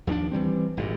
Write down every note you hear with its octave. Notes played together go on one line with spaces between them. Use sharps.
D#2 F3 B3 D4
E3 F3 G3 C4
G#1 G2 A#2